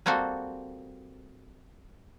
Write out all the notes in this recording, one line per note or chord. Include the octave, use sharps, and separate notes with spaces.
G3 A#3 C4 F#4 A4